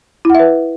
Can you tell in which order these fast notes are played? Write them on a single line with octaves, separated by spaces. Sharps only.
E4 F#5 E5 B4